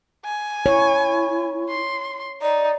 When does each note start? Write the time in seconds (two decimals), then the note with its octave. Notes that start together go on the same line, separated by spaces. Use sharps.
0.25 G#5
0.66 E4 C#5
1.69 C6
2.42 D#4 D5